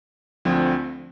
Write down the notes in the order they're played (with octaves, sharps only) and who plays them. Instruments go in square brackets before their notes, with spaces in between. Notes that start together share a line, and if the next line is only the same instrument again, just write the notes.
[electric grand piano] D2 D3 F3 C4